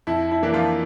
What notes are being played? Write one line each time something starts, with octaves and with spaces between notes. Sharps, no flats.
F2 E4
E4
E3 A#3 D4
F3 F4